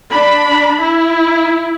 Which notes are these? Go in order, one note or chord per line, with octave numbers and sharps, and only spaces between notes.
D4 B5
E4